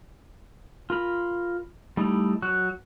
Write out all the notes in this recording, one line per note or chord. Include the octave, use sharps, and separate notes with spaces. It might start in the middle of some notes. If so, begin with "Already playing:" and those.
F4 A#4 B5
G3 A3 D#4 E4
F#3 F#4 F#6